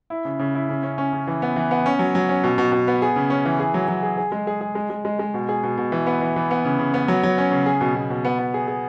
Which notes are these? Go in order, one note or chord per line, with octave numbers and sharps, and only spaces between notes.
E4
C#3
C#3
E4
C#3
C#4
C#4
C#3
E3
B3
E3
B3
C#4
F#3
F#3
C#4
B2
B2
B2
B3
G#4
C#3
C#4
E3
G#4
F#3
F#3
G#4
G#4
G#3
G#4
G#4
G#3
G#3
G#3
G#3
B2
G#4
B2
B2
E3
B3
E3
E3
B3
C#3
C#3
B3
F#3
F#3
C#4
C#3
G#4
B2
B2
B2
B3
B3
G#4
G#4